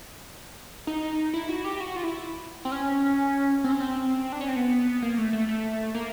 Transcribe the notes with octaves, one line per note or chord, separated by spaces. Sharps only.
D#4
E4
F#4
G4
F#4
F4
E4
C4
C#4
C4
C#4
C4
D4
C#4
C4
B3
A#3
A3
A3
A3
A#3